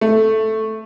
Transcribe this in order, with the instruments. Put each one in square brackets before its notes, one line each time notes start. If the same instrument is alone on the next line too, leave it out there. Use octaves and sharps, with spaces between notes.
[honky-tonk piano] A3